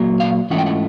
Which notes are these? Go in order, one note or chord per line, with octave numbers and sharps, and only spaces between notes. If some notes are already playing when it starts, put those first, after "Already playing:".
Already playing: A#2 F#3 A#3
F5
G#2 E3 A3 C#4 F4 F#5
G5
F#5